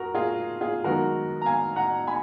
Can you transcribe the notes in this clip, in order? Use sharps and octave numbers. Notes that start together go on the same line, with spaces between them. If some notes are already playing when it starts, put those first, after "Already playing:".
Already playing: F2 F#3 F#4 A#4
F4 G#4
F4 G#4
F#2 D#3 G#3 B3 F#4 A#4
A#5
F5 G#5
F#5 A#5
G#5 B5